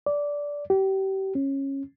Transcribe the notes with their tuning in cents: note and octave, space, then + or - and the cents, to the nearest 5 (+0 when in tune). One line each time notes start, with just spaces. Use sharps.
D5 -15
G4 -30
C#4 -20